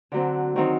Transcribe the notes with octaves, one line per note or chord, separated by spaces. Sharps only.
D3 F#3 C4
D#3 F#3 C4 D#4